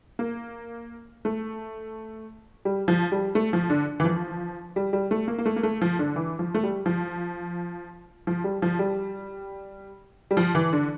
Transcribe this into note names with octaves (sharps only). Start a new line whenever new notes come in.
A#3
A3
G3
F3
G3
A3
F3
D3
E3
F3
G3
G3
A3
A#3
A#3
A3
A#3
A3
F3
D3
E3
F3
A3
G3
F3
F3
G3
F3
G3
G3
F3
E3
D3